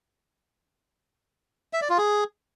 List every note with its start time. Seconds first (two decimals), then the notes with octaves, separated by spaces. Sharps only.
1.73 E5
1.81 D5
1.90 F4
1.98 G#4